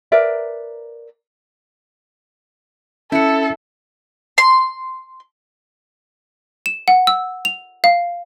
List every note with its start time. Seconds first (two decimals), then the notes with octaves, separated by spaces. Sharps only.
0.12 A#4 B4 D5 E5
3.12 C#4 E4 A4 F#5 C#7
4.38 C6
6.66 E7
6.88 F#5
7.07 E6
7.45 F7
7.84 F5